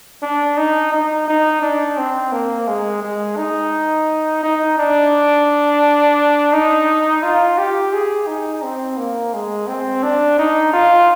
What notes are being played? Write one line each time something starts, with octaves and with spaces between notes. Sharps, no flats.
D4
D#4
D#4
D#4
D4
C4
A#3
G#3
G#3
D#4
D#4
D4
D#4
F4
G4
G#4
D#4
C4
A#3
G#3
C4
D4
D#4
F4